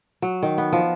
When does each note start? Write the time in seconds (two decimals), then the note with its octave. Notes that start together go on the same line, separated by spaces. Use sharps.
0.22 F#3
0.43 D#3
0.58 B3
0.73 F3